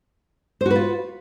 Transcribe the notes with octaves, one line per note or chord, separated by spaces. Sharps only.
F4 F#4 B4 C5